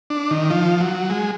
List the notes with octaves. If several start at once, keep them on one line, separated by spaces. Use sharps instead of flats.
D4
D#3
F3
F#3
G#3